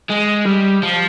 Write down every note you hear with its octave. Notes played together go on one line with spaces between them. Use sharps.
G#3
G3
F3